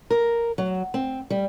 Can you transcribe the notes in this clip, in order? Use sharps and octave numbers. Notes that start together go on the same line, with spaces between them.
A#4
F#3
C4
G3